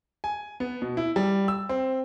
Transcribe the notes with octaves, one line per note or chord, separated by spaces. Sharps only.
G#5
B3
B2
E4
G3
E6
C4